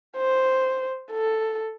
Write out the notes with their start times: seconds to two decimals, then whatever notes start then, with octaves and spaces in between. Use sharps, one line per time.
0.17 C5
1.12 A4